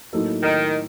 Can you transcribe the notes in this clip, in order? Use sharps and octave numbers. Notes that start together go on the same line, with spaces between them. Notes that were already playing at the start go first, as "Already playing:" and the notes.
A2 F#3 A#3 D#4 A4
D#3